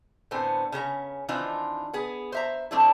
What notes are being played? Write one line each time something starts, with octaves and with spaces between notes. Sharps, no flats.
A2 D3 B3 C4 C5 G#5
C#3 C#4 A4 A#5
D#3 E3 C4 D4 D#4 F4
B3 G#4
C5 E5 A#5
F3 A3 C4 D4 E4